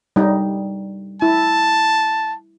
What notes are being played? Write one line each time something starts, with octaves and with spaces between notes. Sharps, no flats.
G3 D#4
E4 A5